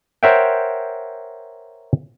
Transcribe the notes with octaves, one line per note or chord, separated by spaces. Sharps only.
A#4 C5 C#5 E5 F#5 G5